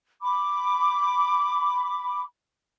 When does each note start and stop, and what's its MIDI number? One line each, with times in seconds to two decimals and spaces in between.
0.22 2.21 83
0.22 2.21 86